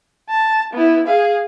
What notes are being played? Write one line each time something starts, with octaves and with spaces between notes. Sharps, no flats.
A5
B3 E4
G#4 F5